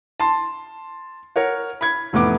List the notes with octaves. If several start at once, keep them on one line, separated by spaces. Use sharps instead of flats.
A5 C6
A#4 C#5 F#5
B5 G#6
F1 A2 E3 B3 D6